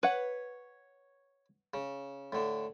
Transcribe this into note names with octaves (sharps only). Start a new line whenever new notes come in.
B4 C#5 F#5
C#3
A2 D3